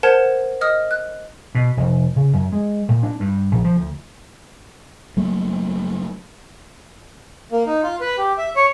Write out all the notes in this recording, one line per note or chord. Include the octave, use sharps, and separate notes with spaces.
A#4 C5 F#5 A5 F6 G#6
D#5 D#6 F6
F#6
B2
F1
C#3
F#2
G#3
A#2
D4
G2
A#1
F3
D2
F#1 F#3 A3 A#3
A#3
D#4
F4
B4
G4
E5
C#5